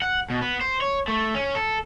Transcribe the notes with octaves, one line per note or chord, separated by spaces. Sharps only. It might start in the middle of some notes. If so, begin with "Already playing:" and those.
F#5
B2
B3
C5
C#5
A3
C#4
A4